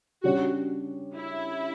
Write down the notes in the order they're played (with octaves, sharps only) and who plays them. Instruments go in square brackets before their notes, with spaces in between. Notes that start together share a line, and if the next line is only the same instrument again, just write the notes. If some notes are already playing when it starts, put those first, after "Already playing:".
[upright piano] C#3 G3 D4 G4 C#5 [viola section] F#4
[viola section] E4